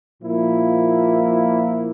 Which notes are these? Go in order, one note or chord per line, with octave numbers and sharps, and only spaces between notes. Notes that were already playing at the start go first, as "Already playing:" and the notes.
A#2 F3 A#3 E4